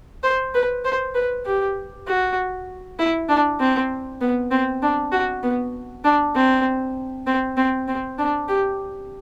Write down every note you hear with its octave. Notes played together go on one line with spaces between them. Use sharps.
C5
B4
C5
B4
G4
F#4
E4
D4
C4
B3
C4
D4
F#4
B3
D4
C4
C4
C4
C4
D4
G4